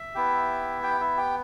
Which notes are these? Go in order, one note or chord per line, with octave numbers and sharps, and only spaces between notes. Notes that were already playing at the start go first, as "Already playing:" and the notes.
Already playing: E5
B3 E4 G4
G4 G5
E4 E5
G4 G5